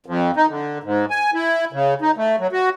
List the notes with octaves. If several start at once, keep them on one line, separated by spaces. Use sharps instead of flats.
F2
D#4
D3
G#2
G#5
E4
C#3
D#4
A3
F#3
F#4